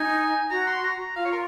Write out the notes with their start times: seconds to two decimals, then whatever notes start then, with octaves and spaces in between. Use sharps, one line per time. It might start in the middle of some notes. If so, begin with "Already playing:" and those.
Already playing: D#4 G#5
0.51 F#4 A#5
0.67 C6
0.84 A#5
1.16 F4 F5
1.25 C#5
1.32 A#4